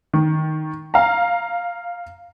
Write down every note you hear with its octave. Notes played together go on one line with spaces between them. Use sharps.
D#3
F5 A#5